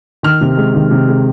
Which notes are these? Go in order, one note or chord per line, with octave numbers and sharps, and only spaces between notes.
D#3 F6
C3
G#3
D#3
C3
G#3